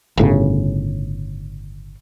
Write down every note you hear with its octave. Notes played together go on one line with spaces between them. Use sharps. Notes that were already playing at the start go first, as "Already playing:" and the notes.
G1 A2 C#3